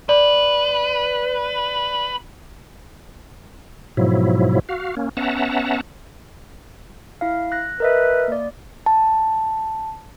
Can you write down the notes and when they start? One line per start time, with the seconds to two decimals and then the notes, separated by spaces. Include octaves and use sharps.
0.09 B4 D5
3.97 G#2 B2 F3 F#3 E4
4.69 F#4 F5
4.97 A#3 C#4
5.17 B3 C#4 E5 F#5 A5 A#5
7.21 E4 F5
7.52 F#6 A#6
7.80 A#4 B4 D#5 E5
8.28 A#3 D5
8.86 A5